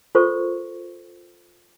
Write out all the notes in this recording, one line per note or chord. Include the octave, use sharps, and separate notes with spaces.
F4 A4 A#4 C5 C6 C#6